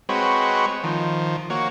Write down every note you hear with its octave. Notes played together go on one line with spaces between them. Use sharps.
G#3 C4 F#4 B4 C#5
D#3 F3
A#3 F#4 C#5